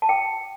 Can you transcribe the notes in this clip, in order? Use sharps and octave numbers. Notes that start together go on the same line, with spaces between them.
A5
G5